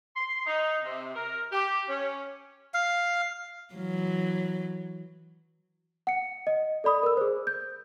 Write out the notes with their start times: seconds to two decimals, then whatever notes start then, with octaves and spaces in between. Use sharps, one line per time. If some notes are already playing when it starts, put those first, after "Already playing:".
0.16 C6
0.46 D#4
0.83 C3
1.15 A#4
1.52 G4
1.89 C#4
2.74 F5
3.74 E3 F#3
6.07 F#5 C#7
6.47 D#5
6.84 A4 D5 B5 D#6
7.03 A#4 E6
7.17 G#4 C5
7.47 G6